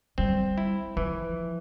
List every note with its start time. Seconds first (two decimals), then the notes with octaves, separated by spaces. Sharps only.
0.18 G3 C4
0.58 E4
0.97 E3 F3